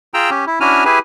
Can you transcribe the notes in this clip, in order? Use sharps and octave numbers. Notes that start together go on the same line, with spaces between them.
F4 G#4 G5 A#5 E6
C#4 G4
E4
C#4 D4 E4 F#4 G#5 F6
E4 G4 G#4 B4 G#5